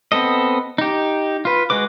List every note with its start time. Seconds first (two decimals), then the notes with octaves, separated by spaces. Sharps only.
0.12 B3 C4 A4 D#5
0.78 D#4 G4
1.45 F4 B4
1.70 G#3 F#4 B4 D6